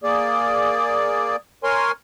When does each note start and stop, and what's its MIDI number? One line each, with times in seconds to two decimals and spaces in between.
0.03 1.36 58
0.03 1.36 68
0.03 1.36 74
1.64 1.92 70
1.64 1.92 73
1.64 1.92 80
1.64 1.92 84